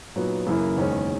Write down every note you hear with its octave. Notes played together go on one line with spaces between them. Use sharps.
A#2 F#3 B3 D#4 F#4
F#2 C#3 E3 A#3 E4
F#1 E2 D#3 G#3 C#4